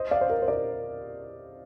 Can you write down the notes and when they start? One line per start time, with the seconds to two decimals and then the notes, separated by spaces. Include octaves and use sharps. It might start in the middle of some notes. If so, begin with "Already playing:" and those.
Already playing: C5 D#5
0.11 D5 F5
0.21 C5
0.30 A#4
0.42 C5
0.48 A#4 D5